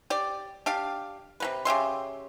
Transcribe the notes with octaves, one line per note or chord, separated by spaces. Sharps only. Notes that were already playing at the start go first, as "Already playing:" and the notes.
G4 D5
D4 G4 F5
C3 A#3 B4
C#3 G4 E5 C6